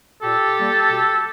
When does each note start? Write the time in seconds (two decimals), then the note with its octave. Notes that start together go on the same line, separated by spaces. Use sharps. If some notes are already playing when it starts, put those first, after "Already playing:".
0.22 A#2 G4 A4
0.56 G3 A#3
0.89 B2